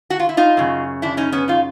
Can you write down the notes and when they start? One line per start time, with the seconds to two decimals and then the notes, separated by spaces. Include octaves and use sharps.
0.10 F#4
0.20 F4
0.29 E4
0.37 D#4 F4
0.57 F#2 C#3
1.02 D4 E4
1.17 C#4 D#4
1.32 B3 C#4
1.48 D#4 F4